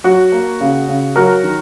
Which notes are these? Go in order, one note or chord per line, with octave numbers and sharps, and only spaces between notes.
F#3 F#4
A#3
C#3
C#3
F#3 F#4 A#4
D#3